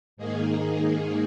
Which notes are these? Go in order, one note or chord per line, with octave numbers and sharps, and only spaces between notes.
G#2 D#3 A#3 D#4 G#4